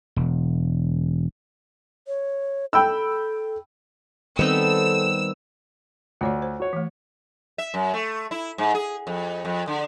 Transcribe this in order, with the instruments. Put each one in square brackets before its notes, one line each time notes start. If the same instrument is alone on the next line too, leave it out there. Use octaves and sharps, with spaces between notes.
[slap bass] E1
[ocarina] C#5
[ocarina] A4 [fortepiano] G5 B5 E6
[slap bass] D#3 G3 [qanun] B3 C4 D#4 [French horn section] A4 [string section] E6
[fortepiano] D2 [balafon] F4 C#5 D5
[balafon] C5
[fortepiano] F#4 C#5
[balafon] E3 A3
[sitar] E5
F#2
A3
E4
G#2
G#4
F2
F2
D3